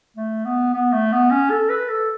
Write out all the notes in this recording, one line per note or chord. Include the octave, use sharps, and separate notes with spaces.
A3
B3
B3
A3
B3
C#4
A4
B4
A4